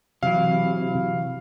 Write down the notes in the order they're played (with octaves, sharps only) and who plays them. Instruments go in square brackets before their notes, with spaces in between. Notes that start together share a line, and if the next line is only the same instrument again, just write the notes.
[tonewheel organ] C3 [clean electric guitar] E3 F#3 [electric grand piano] F5